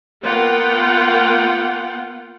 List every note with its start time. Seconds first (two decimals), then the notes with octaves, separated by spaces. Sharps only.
0.22 A#3 B3 F4 F#5 G5